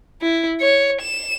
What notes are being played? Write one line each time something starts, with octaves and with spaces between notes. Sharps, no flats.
E4
C#5
E7